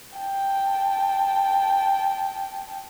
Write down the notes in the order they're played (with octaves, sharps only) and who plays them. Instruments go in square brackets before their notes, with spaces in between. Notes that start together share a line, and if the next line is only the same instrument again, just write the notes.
[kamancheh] G5 A5